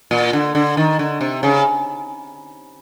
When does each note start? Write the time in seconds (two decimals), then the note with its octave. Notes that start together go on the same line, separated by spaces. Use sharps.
0.11 A#2
0.33 D3
0.55 D3
0.77 D#3
0.99 D3
1.21 C3
1.43 C#3